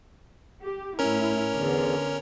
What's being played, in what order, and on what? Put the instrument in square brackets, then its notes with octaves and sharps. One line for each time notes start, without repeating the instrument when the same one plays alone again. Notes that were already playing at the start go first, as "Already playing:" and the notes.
[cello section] G4
[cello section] A2 E4 [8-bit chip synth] C#4 A#4
[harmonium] E2 [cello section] D3